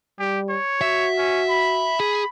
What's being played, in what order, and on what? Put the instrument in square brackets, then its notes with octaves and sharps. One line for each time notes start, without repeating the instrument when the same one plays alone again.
[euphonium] G3 [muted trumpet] G4
[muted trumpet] C#5
[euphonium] F#4 [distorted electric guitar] E5
[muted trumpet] C#4
B5
[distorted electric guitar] G#4